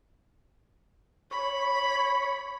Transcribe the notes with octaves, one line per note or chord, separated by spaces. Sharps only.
C#5 B5